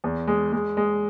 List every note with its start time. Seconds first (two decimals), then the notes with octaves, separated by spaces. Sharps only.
0.04 E2
0.27 G#3
0.52 G#3
0.77 G#3